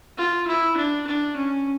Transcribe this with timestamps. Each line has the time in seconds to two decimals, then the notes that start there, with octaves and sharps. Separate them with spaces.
0.17 F4
0.47 E4
0.76 D4
1.07 D4
1.37 C#4